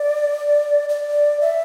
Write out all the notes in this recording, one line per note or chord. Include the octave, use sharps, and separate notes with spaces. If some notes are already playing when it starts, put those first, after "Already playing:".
Already playing: D5
D5
E5